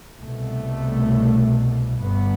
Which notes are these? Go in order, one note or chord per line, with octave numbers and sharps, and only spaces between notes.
C2 B2 A3
G1 G2 B3